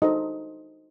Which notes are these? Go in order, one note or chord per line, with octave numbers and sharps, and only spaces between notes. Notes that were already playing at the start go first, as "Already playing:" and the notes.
D4 D#4 F#4 A4 C5 D#5